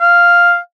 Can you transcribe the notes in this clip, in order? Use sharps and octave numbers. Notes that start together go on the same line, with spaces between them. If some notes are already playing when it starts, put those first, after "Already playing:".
F5